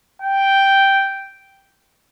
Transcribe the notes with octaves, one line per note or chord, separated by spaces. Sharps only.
G5